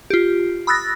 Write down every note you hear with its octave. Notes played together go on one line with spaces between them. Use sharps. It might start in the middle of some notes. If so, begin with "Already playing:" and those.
F4 G4
B5 D#6 E6 F#6 A6 A#6